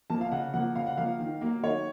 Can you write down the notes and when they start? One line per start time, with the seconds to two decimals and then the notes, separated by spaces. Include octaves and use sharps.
0.10 F3 A#3 A5
0.21 F5
0.32 C#3 F#5
0.54 F3 A#3 F#5
0.76 C#3 F5
0.87 F#5
0.98 F3 A#3 F5
1.20 D#3
1.41 F#3 A#3
1.63 D#3 C#5